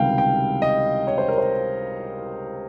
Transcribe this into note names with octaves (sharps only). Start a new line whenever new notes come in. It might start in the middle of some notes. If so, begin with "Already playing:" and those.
Already playing: C#2 C3 D#3 G3 F5 G5
G5
D#5
C#5
C5
A#4
C5